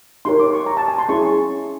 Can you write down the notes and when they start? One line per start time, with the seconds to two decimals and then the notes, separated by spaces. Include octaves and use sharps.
0.25 D#4 G4 A#4 C#5 C6
0.40 D6
0.53 C#6
0.66 A#5
0.77 A5
0.88 G#5
0.98 C6
1.09 C#4 E4 G#4 C#6